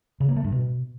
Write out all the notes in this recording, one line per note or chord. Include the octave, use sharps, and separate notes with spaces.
C#3
A#3
A3
G2
B2